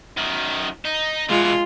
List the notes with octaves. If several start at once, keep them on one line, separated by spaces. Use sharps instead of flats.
F#2 D#3
D#4
B2 E3 G#3 F4